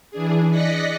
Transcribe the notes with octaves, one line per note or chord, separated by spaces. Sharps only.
E3 D4 G#4
D5 D#5 F#6 A#6 B6 C#7